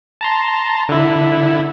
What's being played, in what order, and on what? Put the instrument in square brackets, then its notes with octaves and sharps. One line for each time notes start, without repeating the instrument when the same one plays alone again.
[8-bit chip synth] A5 A#5 C6
D3 E4